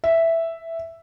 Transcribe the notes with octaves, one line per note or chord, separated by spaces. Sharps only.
E5